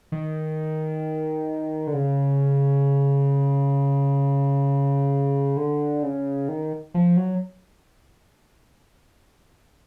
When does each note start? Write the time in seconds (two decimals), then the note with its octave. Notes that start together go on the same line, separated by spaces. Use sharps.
0.12 D#3
1.87 D3
1.94 C#3
5.57 D3
6.03 C#3
6.49 D#3
6.94 F3
7.17 F#3